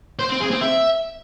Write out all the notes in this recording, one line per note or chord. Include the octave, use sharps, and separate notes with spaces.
C5
C4
G#4
C4
E5